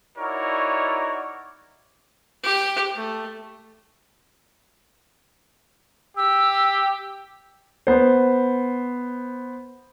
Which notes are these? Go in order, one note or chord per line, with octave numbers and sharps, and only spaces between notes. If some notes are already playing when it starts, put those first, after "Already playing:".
D#4 E4 F#4 A#4 C#5 D5
G4
A3
G4 E6
B3 C5